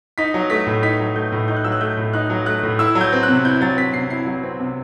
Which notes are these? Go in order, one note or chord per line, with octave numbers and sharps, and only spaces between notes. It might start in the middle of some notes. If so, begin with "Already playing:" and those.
D#4 B6
F#3
A3 B6
A2
D#4 B6
F#3
A3 G6
A2
D#4 G6
F#6
F#3 E6
F#6
A3 G6
A2
D#4 F#6
F#3
A3 F#6
A2
E4 E6
F#3
G6
C4
C3 F#6
E4 G6
F#3 A6
C4 B6
C3 C7
E4 C7
F#3
C4
C3